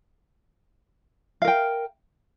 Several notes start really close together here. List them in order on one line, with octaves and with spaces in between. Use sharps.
F5 A#4 G5